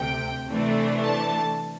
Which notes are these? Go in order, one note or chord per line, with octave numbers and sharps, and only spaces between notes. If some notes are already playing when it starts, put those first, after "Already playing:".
Already playing: D2 C3 G5
C3 E3 A3 D4
A5